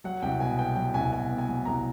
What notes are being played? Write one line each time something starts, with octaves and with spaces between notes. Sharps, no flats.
F#3 F#5
C2 G5
B2 G#5
B3 G5
F#3 G5
C2 G#5
B2 G#5
B3
G#5
F#3
C2 A#5